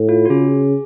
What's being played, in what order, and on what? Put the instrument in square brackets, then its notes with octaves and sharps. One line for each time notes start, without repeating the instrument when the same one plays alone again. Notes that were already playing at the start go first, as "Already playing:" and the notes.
Already playing: [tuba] A2
[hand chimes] F4
F#4
[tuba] C#3 [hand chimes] G#4